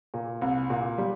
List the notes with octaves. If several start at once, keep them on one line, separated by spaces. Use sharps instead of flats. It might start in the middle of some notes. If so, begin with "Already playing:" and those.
A#2
C2
A#2
G3